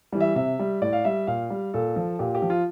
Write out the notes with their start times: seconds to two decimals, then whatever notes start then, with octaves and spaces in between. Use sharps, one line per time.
0.12 E3 G3
0.20 E5
0.35 C3 E5
0.59 G3
0.81 A2 D5
0.93 F5
1.05 G3 E5
1.27 A#2 F5
1.50 G3
1.74 A#2 A4
1.96 F3
2.19 A#2 G4
2.35 G4
2.42 F3
2.50 F4